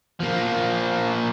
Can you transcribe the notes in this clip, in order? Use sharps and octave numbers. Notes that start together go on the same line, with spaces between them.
F3 A#3